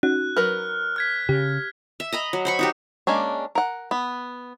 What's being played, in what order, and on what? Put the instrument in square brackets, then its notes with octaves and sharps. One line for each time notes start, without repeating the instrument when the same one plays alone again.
[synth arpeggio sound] C#4 D#4 F#4 [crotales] F#6
[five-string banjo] F#3 A#4 B4 [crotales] F6
[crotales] F6 G#6 B6
[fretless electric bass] C#3 [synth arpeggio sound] G4
[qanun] E5
D#5 A#5 B5
F#3
C5 B5 C#6
D#4 F#4 G4
[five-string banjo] G#3 A#3 C#4 D4
A#4 F#5
B3